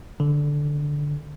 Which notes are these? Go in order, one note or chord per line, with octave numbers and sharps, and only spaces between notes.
D3